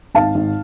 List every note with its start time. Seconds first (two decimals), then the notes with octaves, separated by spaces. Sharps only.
0.15 G#1 F5 A5
0.35 G#1